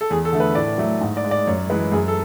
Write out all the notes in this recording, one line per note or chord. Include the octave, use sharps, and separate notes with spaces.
A4
E2 G#4
A4
D3 A3
B4
A2 D5
F#3 A3
G#2
D5
G#3
D5
F#2 C#5
E3 G#3 B4
F#2 G#4
A4